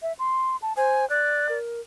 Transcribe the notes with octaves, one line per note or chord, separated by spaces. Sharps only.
E5
C6
A5
C5 G#5
D5 F#6
A#4